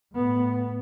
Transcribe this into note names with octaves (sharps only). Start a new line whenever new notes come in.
A2 B3